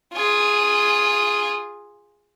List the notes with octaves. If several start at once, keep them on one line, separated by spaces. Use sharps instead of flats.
F4 G#4